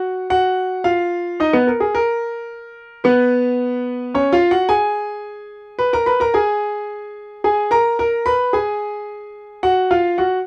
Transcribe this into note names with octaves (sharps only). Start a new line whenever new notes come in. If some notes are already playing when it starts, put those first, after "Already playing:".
Already playing: F#4 F#5
F#4 F#5
F4 F5
D#4 D#5
B3 B4
A#4
G#4
A#4
B3 B4
C#4 C#5
F4 F5
F#4 F#5
G#4 G#5
B4 B5
A#4 A#5
B4 B5
A#4 A#5
G#4 G#5
G#4 G#5
A#4 A#5
A#4 A#5
B4 B5
G#4 G#5
F#4 F#5
F4 F5
F#4 F#5